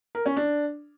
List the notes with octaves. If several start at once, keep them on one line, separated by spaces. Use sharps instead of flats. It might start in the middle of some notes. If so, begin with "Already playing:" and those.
A#4
C#4
D4